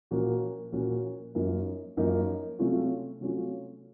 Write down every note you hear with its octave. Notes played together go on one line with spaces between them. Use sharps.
A#2 F3 A#3 C#4 F#4
A#2 F3 A#3 C#4 F#4
F#2 F3 A#3 D#4 A#4
F#2 F3 A#3 D#4 A#4
C3 F#3 A3 C#4 F4
C3 F#3 A3 C#4 F4